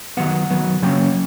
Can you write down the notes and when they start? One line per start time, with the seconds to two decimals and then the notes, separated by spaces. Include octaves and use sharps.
0.17 D#3 F#3 B3 F#5
0.50 D#3 F#3 B3
0.82 C#3 F#3 A#3 C#4 G5